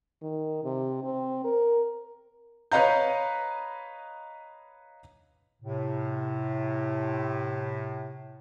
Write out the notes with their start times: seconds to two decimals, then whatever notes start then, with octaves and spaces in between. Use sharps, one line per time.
0.21 D#3
0.64 C3
1.04 C4
1.44 A#4
2.72 B4 C#5 D#5 F5 A#5 G6
5.62 A2 C3